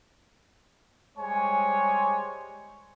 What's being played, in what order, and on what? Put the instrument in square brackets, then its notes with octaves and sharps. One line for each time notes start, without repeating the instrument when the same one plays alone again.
[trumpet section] G3 G#3 C5 C#5 G#5